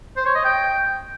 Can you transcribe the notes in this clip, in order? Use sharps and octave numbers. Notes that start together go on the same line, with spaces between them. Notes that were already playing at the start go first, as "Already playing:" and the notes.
C5
C#5
D#5
G5